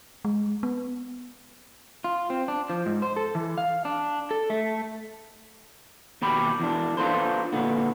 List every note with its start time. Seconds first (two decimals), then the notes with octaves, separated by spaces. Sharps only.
0.25 G#3
0.63 B3
2.04 F4
2.30 C4
2.48 D4
2.70 F3
2.86 G#2
3.02 C5
3.16 A4
3.35 E3
3.58 F5
3.85 D4
4.31 A4
4.50 A3
6.22 D#2 B2 G4 B5
6.60 E2 D4
6.97 D4 F4 G#4 A4 B4 C5
7.52 A#2 D3 B3